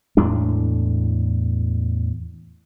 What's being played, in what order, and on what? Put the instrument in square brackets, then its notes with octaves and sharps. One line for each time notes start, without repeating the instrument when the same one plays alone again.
[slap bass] E2 A2 G#3 D4